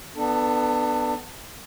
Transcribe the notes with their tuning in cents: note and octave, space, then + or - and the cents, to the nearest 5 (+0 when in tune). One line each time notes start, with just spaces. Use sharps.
B3 +10 D4 +30 A4 +0